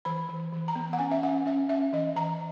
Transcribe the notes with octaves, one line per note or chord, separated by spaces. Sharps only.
E3 B5
E3
E3
A#5
B3
F#5
C#4 G#5
E5
C#4 F#5
C#4 E5
C#4 E5
E3 D#5
E3 A#5